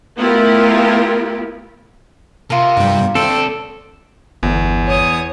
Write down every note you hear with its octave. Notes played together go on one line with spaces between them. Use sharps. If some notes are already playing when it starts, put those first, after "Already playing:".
A3 B3 E4 F4 G4 A#4
C3 F4 A#4
G2 G3
A3 C4 A4 D5
G1 E2
C#5 D#6